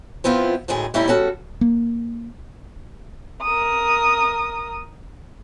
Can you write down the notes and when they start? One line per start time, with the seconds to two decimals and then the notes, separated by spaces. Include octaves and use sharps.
0.24 F3 B3 C4 E4 F4
0.68 D2 A2 D#3 G#3 G#4
0.94 G3 A3 C#4 D#4 E4
1.07 G3 C#4 F#4 A4
1.61 A#3
3.42 A#4 D#6